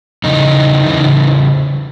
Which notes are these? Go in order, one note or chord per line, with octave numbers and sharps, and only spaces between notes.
E2 C#3 E3 D#4
E2 C#3 E3